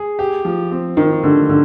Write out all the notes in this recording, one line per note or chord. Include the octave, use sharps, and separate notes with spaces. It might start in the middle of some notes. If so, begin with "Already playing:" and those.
Already playing: G#4
G4
F3
C4
D#3 F3
D3 G4
D3 F3